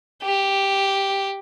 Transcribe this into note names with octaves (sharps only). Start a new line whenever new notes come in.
G4